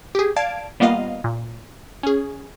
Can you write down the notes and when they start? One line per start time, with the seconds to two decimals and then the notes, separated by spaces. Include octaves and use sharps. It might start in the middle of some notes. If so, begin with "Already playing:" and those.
0.15 G4 G#4
0.36 D5 F5 A5 G#6 D7
0.80 G3 A#3 B3 F4 D#5 F5
1.24 A#2
2.03 C#4 G#4